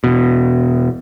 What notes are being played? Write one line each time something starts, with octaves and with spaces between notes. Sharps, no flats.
E1 B2